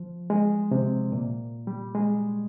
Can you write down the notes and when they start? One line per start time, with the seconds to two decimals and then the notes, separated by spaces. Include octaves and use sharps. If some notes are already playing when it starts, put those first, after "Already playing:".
Already playing: F3
0.30 G#3
0.71 C3
1.12 A#2
1.67 G3
1.94 G#3